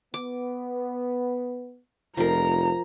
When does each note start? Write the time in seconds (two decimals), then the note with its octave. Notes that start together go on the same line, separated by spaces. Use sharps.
0.14 B3 D6
2.17 F1 F3 A#4 A#5